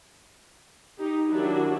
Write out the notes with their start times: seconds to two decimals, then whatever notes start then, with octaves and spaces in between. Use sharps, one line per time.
0.99 D#4 G4
1.29 D#3 F#3 D4 E4 F#4 G4